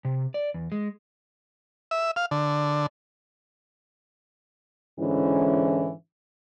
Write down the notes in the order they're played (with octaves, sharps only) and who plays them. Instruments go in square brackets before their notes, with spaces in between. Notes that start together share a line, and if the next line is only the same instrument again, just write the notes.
[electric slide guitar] C3
D5
E2
G#3
[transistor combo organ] E5
F5
D3
[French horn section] G#2 D3 E3 C#4 E4